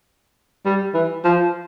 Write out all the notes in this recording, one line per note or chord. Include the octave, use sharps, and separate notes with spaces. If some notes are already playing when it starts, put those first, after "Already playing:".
G3
E3
F3